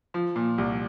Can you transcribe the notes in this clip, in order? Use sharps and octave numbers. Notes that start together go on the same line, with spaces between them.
F3
A#2
C2